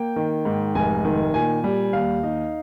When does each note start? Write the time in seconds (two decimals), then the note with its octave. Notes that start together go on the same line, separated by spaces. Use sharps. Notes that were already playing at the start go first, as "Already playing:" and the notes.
Already playing: A#3 G5
0.16 D#3
0.45 G#2
0.75 F1 G#5
1.05 D#3
1.34 A#2 G#5
1.64 G3
1.93 D#2 F5
2.23 D#4